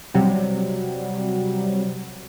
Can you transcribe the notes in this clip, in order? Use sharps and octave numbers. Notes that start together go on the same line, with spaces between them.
C3 F#3 G3